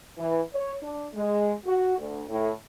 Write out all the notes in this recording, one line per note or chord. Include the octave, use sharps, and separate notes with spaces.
E3
C#5
D4
G#3
F#4
D2
A2